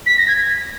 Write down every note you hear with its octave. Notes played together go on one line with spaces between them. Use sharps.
B6
A#6
G#6